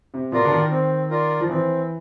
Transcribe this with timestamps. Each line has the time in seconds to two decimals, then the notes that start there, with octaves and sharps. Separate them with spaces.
0.14 C3
0.32 B2 F4 A#4 D5
0.45 D3
0.52 D#3
0.71 C4
1.10 F4 A#4 D5
1.41 F3
1.49 E3 C4